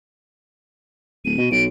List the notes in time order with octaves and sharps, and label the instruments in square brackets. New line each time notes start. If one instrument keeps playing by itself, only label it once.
[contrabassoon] D1 [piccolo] D#7
[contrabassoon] B2
[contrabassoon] B1 [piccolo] D7